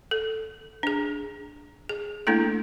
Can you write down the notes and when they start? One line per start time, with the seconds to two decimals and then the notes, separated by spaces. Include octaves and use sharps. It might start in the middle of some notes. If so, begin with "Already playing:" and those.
0.11 A4
0.83 D4 G#4
1.89 G#4
2.27 A3 A#3 D4 E4 A4